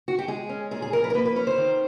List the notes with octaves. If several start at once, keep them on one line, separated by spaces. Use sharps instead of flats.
F#4
G4
G#3 G#4
C#4
A#2 G#4
G#4
F3 A#4
B4
A#4
A#3 B4
B4
C#4 B4
C5
D#3